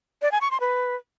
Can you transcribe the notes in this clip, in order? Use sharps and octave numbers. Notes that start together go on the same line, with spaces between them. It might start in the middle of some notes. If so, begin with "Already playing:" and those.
D5
G#5
C#6
C6
B4